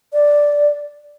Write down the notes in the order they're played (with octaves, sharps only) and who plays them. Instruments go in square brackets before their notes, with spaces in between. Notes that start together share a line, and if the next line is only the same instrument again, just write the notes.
[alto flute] D5